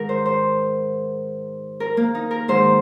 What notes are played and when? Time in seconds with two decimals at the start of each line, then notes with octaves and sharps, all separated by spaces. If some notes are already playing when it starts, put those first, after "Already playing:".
Already playing: G#2 D#3 A#4
0.09 C5
0.26 C5
1.80 A#4
1.97 A#3
2.15 D#4
2.31 A#4
2.48 G#2 D#3 C5